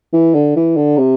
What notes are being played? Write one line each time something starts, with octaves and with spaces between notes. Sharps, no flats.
E3
D3
E3
D3
C3